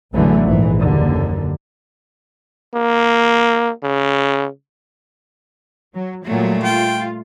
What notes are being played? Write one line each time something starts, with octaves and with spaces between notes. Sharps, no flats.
A1 E2 D3 E3 F#3 A3
A#1 G#2 E3
F#1 D#2 D3
A#3
C#3
F#3
A#2 F#3 G3 A3
F4 G5